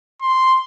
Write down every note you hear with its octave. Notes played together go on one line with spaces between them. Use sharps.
C6